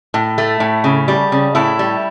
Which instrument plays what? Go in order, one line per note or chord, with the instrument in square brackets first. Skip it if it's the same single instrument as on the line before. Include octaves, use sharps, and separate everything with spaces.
[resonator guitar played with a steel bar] A2
A3
A2
C#3
G3
C#3
A2 E4
G3